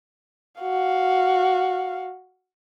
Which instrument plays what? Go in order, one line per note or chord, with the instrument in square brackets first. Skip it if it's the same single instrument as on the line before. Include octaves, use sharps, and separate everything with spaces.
[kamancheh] F#4 F5